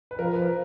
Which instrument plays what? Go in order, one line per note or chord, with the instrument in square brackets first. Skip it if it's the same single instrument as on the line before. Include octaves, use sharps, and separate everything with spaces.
[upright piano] B4
[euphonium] F3 [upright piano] A#4
[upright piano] B4